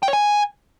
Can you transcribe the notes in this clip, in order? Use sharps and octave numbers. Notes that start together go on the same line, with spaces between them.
G5
C#5
G#5